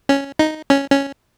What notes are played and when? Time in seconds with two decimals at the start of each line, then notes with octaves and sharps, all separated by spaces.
0.09 C#4
0.39 D#4
0.70 C#4
0.90 C#4